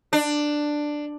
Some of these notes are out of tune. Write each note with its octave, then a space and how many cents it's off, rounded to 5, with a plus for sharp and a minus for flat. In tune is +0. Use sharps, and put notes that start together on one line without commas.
D4 +10